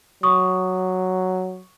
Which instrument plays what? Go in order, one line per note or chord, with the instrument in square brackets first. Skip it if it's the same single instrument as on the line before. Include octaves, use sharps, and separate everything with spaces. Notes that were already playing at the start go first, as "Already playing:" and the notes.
[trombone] F#3 [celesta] C#6 D#6